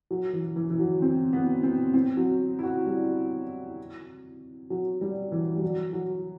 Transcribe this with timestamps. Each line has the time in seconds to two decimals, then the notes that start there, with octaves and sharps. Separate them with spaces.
0.11 F#3
0.33 E3
0.56 E3
0.70 E3
0.79 F#3
1.02 C4
1.33 B3
1.63 C4
1.94 C4
2.17 F#3
2.59 E4
2.63 F#4
2.86 G3
4.70 F#3
5.01 G3
5.32 E3
5.56 G3
5.62 F#3
5.93 F#3